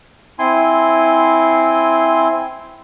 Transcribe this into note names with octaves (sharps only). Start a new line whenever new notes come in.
C4 E4 G#5 C6